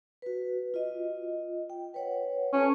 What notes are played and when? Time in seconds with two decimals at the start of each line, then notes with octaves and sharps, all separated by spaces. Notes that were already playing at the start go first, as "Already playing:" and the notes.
0.22 F#4 B4
0.74 F4 D#5
1.70 G5
1.94 B4 C#5 F#5
2.53 C#4 F4 A4 A5